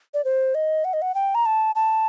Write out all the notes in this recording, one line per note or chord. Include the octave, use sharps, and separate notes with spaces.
D5
C5
D#5
F#5
D#5
F#5
G5
A#5
A5
A5